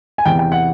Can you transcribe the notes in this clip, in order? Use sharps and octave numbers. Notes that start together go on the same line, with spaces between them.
G#5
E2 C3 E3 G5
G5
F#5